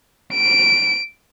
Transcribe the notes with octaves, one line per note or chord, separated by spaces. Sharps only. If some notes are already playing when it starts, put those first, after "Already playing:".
D7